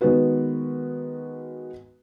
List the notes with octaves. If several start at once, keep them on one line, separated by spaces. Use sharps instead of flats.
D#3 G#3 B3 F#4 B4